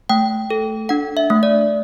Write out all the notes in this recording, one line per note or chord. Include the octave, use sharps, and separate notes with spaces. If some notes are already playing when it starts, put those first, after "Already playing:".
A3 G5
A4
D4 F#5
E5
A3
D5